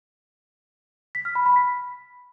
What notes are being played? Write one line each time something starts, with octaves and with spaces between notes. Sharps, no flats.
B6
F6
B5
B5
B6